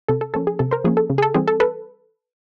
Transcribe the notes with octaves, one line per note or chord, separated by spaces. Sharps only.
C3 A4
A4
F3 A#3 C#4 A4
G#4
C3 A4
A#4 C5
F3 A#3 C#4 G#4
A4
C#3
G#4
A4
E3 G3 C4 G#4
A4
A4 B4